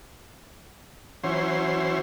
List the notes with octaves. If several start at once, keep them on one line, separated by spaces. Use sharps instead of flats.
E3 F#3 C#4 C5